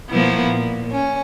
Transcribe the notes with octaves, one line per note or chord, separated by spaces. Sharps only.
B2 F3 A#3 B3 E4
A#2
C#4